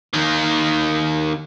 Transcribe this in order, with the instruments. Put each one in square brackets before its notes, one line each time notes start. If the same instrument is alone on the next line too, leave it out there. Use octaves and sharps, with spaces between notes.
[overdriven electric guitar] D#3 A#3